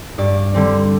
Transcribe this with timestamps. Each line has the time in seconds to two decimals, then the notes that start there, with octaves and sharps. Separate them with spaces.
0.18 G2 D5
0.54 D3 G3 C4